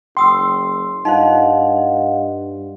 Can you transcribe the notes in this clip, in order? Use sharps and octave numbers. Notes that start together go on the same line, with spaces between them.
F#1 G5 C6 D#6 E6
G2 D#4 F4 C5 D#5 F5 F#5